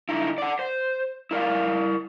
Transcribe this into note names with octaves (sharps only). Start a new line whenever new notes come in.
D3 D#4 E4
D5 F#5
C5
E4 A#4 D5 F5